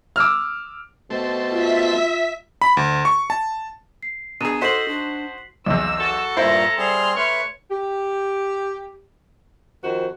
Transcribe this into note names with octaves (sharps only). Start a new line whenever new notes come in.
D6 E6 F6
B2 A3 C4
F4 E5 B6
B5
D2
C#6
A5
C7
B2 D4 G#4 A#5 D#7
D#4 F#4 A4 C5 B6 C7 F#7
D4
B1 E2 E6
F#4 A4
G2 A#2 A3 E4 C5 A#5 A#6
G3 C4 G#4 C6 F6
A3 B4 C#5
G4
F2 D#3 F#4 C5